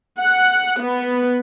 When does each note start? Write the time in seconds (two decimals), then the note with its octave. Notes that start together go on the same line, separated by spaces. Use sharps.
0.19 F#5
0.80 B3